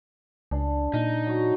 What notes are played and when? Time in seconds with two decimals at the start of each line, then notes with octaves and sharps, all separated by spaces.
0.51 C#2 D4 G#4
0.94 A#2 D#4
1.26 F#3 F#4